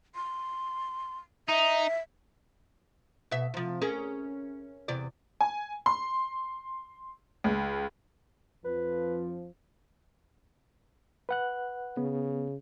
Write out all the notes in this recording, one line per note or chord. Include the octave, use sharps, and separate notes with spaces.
C6
D#4 E5
B2 E5
C3 F3
C#4 G#4 A#4
E2 C3 D5
G#5
C6
C#2
F2 F3 B4
B4 F#5 F#6
C#3 B3